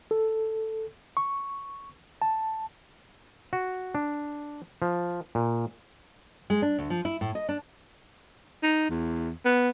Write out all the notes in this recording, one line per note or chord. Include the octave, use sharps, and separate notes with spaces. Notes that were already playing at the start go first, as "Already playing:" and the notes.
A4
C#6
A5
F#4
D4
F3
A#2
G#3
D4
D2
F3
E4
A2
D#5
D4
D#4
E2
B3